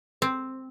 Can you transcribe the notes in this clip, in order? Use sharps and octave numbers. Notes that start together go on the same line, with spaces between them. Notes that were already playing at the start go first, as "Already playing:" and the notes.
C4